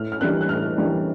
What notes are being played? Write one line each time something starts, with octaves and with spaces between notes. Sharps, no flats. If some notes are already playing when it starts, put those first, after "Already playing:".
Already playing: A2 F6
F6
E3 G3 A#3 D4 F#6
F#6
A2 F6
E3 G3 A#3 D4